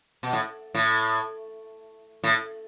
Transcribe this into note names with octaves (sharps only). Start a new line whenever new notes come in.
B2
A2
A2
A2